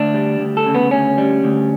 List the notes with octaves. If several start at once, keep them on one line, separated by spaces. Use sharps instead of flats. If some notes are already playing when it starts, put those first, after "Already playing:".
Already playing: D2 D4
G3
D2
A4
C#3
B3
D2 C#4
G3
D2